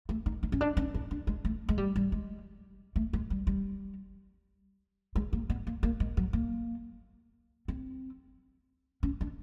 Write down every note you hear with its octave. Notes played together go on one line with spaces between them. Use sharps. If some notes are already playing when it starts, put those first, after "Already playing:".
A3
D#4
D#4
C#4
D4
C#4
D#4
D4
G#3
A3
G#3
G3
G3
G#3
A3
G#3
G3
G3
G#3
A#3
B3
A#3
A#3
G#3
F#3
A#3
C4
C#4
D4